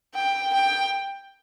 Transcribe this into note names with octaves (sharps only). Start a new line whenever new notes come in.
G5
G5